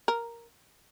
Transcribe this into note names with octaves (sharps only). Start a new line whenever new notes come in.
A#4